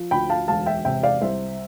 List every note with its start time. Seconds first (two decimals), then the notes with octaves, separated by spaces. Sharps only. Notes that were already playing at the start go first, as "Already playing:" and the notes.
Already playing: F3
0.11 D2 G5 B5
0.30 F5 A5
0.48 E1 F5 A5
0.66 E5 G5
0.85 C3 E5 G5
1.03 D5 F5
1.21 C2 C5 E5